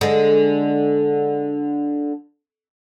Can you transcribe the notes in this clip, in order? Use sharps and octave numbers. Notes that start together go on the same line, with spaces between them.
D3 G#3